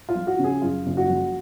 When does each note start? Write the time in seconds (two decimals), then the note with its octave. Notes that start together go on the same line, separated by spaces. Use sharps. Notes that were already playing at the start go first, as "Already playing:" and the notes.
0.09 F4
0.15 F3
0.27 F#4
0.39 C#3
0.44 G#4
0.62 F#2 F4
0.86 F#1
0.97 F#4
1.09 F3